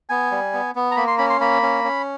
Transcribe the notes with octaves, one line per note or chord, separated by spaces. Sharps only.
B3 G#5
G3
B3
B3
A#5
A#3 B5
C6
C#4 B5
C6
A#3 B5
C#4
C#4